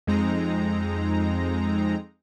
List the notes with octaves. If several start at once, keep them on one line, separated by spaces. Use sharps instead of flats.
F2 G#3 C4 D#4 A#5